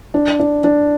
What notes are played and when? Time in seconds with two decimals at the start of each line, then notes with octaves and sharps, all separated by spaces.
0.14 D4
0.40 D4
0.64 D4